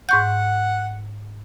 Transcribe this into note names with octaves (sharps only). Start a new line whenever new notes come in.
G#2 F#5 C#6 G6